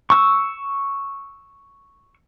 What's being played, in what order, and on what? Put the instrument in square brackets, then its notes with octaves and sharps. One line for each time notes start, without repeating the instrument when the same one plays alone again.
[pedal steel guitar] C#6 E6